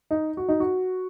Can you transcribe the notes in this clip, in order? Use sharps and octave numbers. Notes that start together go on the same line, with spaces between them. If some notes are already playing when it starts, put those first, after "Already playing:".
D#4
F#4
D#4
F#4